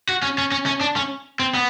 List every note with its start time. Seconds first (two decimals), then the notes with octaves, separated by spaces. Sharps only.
0.09 F#4
0.22 C#4
0.38 C#4
0.52 C#4
0.66 C#4
0.81 D4
0.96 C#4
1.40 C4
1.55 B3